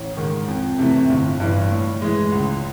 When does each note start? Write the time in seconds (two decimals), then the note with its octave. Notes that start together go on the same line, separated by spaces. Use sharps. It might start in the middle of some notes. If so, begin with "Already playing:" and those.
Already playing: A1
0.17 G#2 D#3
0.48 F2
0.78 C3 E3 A3
1.10 G1
1.40 G2 E3
1.71 A2
2.02 E3 G#3
2.32 C#2